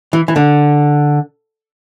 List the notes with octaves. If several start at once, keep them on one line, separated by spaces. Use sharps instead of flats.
E3
E3
D3